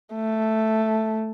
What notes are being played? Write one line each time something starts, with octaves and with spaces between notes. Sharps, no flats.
A3